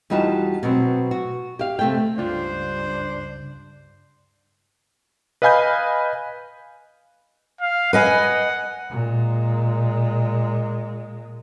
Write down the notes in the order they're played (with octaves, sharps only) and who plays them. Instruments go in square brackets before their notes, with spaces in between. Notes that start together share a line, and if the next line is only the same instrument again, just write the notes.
[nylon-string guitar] E2 G3 D#4 F4 F#4 A5
B2 F#3 B3 C4
F#4
G4 F5
C3 A3 G5
[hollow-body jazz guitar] C#2 F4 [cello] G2 [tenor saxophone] D4 [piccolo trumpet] C5
[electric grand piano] B4 D#5 F5 G#5 B5 G6
[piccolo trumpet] F5
[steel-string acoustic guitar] B4 D#5 G#5 [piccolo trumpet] F#5
[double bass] A#2 G#3